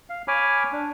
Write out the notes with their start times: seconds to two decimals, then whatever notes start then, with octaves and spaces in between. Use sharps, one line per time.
0.10 F5
0.28 C#5 G#5 B5 D6 F6
0.72 D4